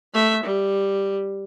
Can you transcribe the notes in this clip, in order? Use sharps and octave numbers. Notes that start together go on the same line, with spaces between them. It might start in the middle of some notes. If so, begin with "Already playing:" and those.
A3 E5
G3